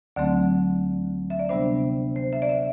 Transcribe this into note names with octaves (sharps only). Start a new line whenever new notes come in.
D2 D3 F#3 A3 C4 D5
E5
D5
C3 G3 B3 D4 C5
C5
E5
D5
E5